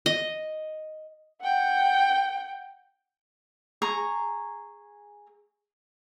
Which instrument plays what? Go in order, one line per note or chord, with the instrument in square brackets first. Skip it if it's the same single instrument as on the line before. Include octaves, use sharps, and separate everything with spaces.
[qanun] D#5
[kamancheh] F#5 G5
[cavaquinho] G#4 A#5 C#6